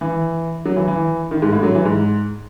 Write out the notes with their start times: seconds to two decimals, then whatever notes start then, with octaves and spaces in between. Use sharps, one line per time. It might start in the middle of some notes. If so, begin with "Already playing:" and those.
0.01 E3
0.65 F#3
0.76 E3
0.88 E3
1.31 D#3
1.42 G#2
1.53 A2
1.63 F#3
1.75 E3
1.85 G#2